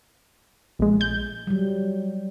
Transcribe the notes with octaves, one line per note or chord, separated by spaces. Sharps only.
A#1 G#3
G6
F#3 G3